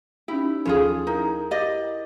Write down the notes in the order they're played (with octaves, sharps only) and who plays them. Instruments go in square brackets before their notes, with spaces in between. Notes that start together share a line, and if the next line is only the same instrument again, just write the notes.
[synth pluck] C#4 D#4 G4 [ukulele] E4
[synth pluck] D#2 F3 A4 [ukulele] C#4 F4 G#4
[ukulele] D#4 [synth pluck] E4 G#4 A#4
[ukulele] G4 D5 D#5